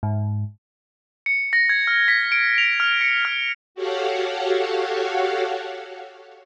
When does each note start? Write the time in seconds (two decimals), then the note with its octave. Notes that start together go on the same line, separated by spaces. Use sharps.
0.03 G#2
1.26 C#7
1.53 A#6
1.69 G#6
1.87 F6
2.08 B6
2.32 D7
2.58 F7
2.80 F6
3.01 C#7
3.25 F6
3.75 F#4 G4 A4 C#5 F5 F#5